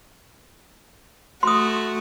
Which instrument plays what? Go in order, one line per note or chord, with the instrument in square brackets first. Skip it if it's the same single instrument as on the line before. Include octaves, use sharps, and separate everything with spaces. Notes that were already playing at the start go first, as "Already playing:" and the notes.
[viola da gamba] A3 F#4 [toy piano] C6 D#6